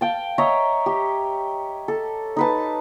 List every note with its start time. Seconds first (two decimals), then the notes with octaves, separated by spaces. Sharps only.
0.01 F5 G5 A5
0.38 C#5 D#5 E5 A#5
0.86 G4
1.88 A4
2.36 D#4 B4 A5